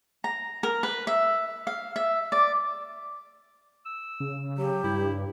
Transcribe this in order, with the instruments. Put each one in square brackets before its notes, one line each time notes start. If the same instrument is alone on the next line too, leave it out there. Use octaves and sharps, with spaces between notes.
[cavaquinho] A#5
A#4
B4
E5
F5
E5
D5
[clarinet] E6
[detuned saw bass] C#3
[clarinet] F#3 [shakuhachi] G4
[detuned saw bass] G2 [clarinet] E4